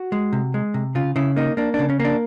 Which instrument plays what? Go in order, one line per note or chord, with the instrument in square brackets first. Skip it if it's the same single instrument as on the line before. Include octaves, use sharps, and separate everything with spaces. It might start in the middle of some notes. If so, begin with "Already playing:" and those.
Already playing: [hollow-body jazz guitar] F#4
G#3
C3
G#3
C3
C#3 F4
C#3 E4
A#3 D#4
A#3 D4
D4
C#3
C#4
A#3
D4